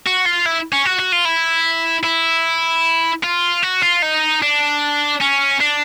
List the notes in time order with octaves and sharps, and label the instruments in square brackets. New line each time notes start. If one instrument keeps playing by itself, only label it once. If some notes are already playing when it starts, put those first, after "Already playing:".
[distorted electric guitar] F#4
F4
E4
C#4
F#4
F#4
F4
E4
E4
F4
F#4
F4
D#4
D4
C#4
D4